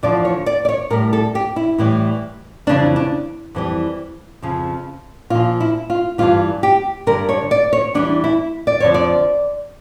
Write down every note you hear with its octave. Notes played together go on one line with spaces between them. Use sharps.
E2 D3 F3 D5
C#5
D5
D5
C#5
A2 G3 A#4
A4
G4
E4
A2 E3 G3
F2 C#3 E3 G3 D4
D4
F2 E3 G3
F2 C#3 F3
A#2 F3 F4
E4
F4
G2 E3 G3 F4
G4
G2 D3 G3 A#4
C#5
D5
C#5
E2 E3 G3 D4
E4
D5
F2 D3 F3 C#5
D5